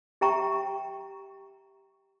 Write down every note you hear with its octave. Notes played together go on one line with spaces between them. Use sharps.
G4 E5 G5 A#5 C#6